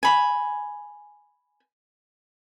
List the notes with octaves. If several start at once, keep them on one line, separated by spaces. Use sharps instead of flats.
G#5 B5